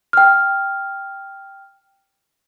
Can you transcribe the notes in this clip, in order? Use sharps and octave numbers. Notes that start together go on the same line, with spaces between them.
G5 F6